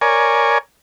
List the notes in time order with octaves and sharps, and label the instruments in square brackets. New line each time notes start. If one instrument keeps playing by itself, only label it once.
[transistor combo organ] A#4 C#5 D5 G#5